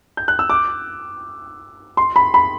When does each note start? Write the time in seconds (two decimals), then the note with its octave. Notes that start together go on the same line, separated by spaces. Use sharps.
0.17 G6
0.28 F#6
0.39 E6
0.50 D6
1.97 C6
2.16 B5
2.34 B5